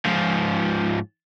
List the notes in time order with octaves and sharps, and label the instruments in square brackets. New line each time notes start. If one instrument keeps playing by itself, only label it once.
[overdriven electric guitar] G#2 F3